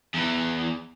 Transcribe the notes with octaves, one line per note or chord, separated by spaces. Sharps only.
E2 E3